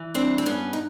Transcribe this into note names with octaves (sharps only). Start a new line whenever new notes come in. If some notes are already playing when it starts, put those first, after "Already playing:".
Already playing: E3
G3 C4 D4
C4
G2 B3 C#4
D#4